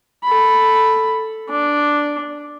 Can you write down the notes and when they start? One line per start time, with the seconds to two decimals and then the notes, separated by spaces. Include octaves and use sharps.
0.24 A4 B5
1.49 D4